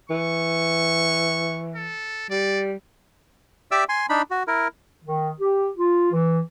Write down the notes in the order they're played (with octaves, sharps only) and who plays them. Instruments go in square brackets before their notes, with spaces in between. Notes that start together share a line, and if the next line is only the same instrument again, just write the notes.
[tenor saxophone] E3 [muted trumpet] C#6
[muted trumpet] A4
[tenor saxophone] G3 [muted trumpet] D5
[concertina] G4 D5 E5 D6 E6
G#5 C6
D4 D#4 B5
F#4
E4 A#4
[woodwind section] D#3
G4
F4
E3